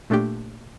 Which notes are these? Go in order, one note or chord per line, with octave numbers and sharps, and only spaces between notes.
A#2 A3 D4 G4